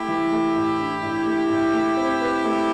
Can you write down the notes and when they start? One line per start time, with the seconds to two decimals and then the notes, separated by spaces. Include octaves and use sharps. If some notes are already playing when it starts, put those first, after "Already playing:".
Already playing: A3 E4 G4
0.08 E3
0.32 A3
0.56 A2
0.79 D4
1.03 A2
1.26 A3
1.49 A2
1.73 A3
1.97 C4
2.20 B4
2.44 A3